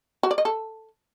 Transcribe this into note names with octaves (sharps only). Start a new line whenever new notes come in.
F#4
D5
D#5
A4